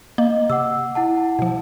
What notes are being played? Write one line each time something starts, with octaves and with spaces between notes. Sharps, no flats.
A#3 D#5
C3 F#5 D6 E6
E4 F#5 A5
B2 F3